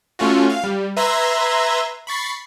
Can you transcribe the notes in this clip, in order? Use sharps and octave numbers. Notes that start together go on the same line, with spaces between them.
A3 C#4 F4 F#4
F5
G3
B4 E5 A#5 C6 G#6 A#6
B5 C#6 A6 C7